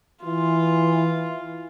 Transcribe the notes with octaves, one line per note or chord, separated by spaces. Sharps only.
E3 F4